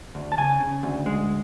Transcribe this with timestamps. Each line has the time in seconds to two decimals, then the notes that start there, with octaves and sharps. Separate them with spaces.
0.15 D2
0.32 A5
0.38 C#3 G#5
0.60 C#3
0.83 D2
1.06 G#3